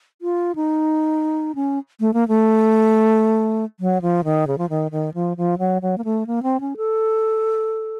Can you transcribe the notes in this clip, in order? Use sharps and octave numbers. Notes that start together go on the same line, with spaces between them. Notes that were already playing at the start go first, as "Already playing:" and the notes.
F4
D#4
C#4
A3
A#3
A3
F#3
F3
D#3
C#3
F3
D#3
D#3
F3
F3
F#3
F#3
A#3
A3
A#3
C4
C#4
A4